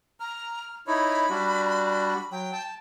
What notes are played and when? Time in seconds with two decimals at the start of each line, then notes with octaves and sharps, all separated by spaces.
0.20 A#5 F6
0.87 D#4 E4 C#5 B5
1.30 G3 D4 F#4
2.31 F#3 G5
2.53 A5